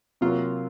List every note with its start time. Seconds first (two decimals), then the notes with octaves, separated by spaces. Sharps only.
0.21 C3 F#3 A#3 F4